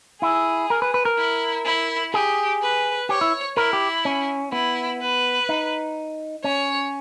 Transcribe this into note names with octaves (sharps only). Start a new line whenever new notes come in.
E4 G#4
A#4
B4
B4
A#4
E4
E4
G4 G#4
B4
G4 C#5
E4
E4 A#4
G4
C#4
B3 E4
B4
D#4
C#4 C#5